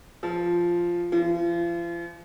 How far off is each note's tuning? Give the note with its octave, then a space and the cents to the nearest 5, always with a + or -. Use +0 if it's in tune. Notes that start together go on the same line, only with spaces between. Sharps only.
F3 -5
F3 -40